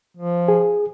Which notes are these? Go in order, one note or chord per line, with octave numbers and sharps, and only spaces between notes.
F3
G#4